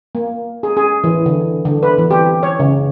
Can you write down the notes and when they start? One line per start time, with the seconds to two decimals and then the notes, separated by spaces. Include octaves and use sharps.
0.15 A#3
0.63 G#4
0.77 G#4
1.04 E3
1.26 D3
1.65 D3
1.83 B4
1.98 E3
2.11 G4
2.43 C#5
2.60 C#3